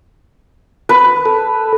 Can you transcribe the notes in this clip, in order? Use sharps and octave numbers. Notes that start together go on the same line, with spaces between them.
B4
A4